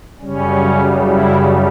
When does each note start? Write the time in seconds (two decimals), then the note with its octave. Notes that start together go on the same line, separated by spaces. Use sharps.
0.21 F#2 C#3 G3 C#4
1.06 E4